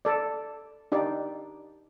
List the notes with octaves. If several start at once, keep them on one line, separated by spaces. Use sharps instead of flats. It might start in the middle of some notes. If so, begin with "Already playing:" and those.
A4 D5
D4 D#4 G4 D5